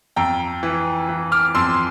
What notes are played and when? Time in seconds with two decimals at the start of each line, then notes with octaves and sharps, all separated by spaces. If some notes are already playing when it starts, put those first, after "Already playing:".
0.16 F2 G5 A#5
0.63 E3
1.09 E3
1.32 D6 F6
1.55 F2 C6 E6